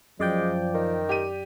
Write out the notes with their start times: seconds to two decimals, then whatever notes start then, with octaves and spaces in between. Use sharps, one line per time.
0.20 F#2 F3 G#3 D5 G5
0.74 D#3
1.09 G4 D#7